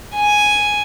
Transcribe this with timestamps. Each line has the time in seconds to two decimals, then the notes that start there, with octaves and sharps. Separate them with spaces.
0.15 G#5